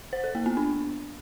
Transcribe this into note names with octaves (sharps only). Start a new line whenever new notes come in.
C5
A4
A#3
B3
D4